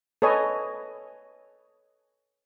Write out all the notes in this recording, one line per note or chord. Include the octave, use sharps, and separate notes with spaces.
A4 B4 C#5 D#5 G#5